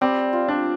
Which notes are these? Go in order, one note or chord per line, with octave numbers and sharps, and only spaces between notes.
G3 C4
F4
D4